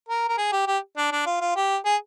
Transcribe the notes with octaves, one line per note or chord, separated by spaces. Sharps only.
A#4
A#4
G#4
G4
G4
D4
D4
F4
F4
G4
G#4